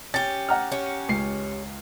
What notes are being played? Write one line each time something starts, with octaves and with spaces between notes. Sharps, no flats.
C#4 G4 A6
F#5 A#5 F6
C#4 G4
C#2 C7